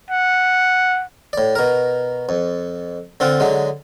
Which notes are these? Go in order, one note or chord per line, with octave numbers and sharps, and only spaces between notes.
F#5
A2 D5
B2 A#4
F2
D3 C4 F4 F#5
D3 F#3 G#3